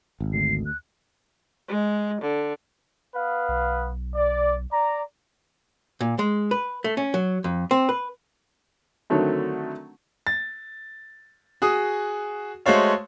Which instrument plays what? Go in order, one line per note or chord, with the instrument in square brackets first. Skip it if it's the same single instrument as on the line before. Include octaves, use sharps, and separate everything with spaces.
[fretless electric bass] G#1
[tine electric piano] D2 [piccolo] C7
[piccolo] F#6
[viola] G#3
D3
[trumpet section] B3 B4 F5
[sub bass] B1
[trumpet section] D5
D5 A#5
[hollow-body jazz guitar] A#2
G#3
B4
A3
C#4
F#3
F2
C4
B4
[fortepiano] D3 D#3 F#3 A3 C4
[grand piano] A6
F#4 G#4 D#6
G#3 A3 F#4 C5 C#5 F5